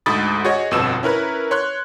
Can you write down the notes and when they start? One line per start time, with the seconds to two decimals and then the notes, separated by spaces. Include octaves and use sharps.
0.06 D2 G#2 B5 D#6 A6
0.45 F#4 G#4 C#5 D#5
0.71 G1 F2 B2 B3 E6 E7
1.03 C#4 E4 A#4 B4
1.51 C#5 C6 F#6